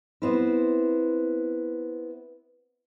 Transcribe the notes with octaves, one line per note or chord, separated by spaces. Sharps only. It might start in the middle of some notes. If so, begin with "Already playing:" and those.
B3 C4 E4